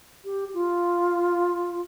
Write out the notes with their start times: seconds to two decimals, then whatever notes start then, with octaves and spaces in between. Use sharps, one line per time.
0.25 G4
0.54 F4